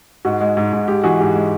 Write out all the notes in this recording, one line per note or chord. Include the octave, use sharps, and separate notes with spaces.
G#2 F#4
G#3
G#2
G#2
G#3 G4
E3 F#4 G#4
G#2 G4
G#3